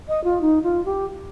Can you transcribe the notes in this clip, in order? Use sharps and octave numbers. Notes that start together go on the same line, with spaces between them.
D#5
F4
D#4
F4
G4